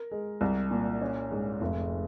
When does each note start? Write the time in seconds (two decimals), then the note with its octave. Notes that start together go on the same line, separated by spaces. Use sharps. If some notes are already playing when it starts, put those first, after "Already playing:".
Already playing: A#4
0.11 G#3
0.41 C2
0.71 A#2
1.01 C#4
1.31 G#2
1.61 F1